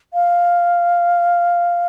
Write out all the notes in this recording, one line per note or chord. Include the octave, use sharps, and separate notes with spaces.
F5